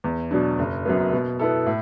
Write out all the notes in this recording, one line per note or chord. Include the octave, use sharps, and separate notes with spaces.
E2
B2 F#3 D4
F#1
F#2 F#3 B3
B2
B3 E4 A4
A2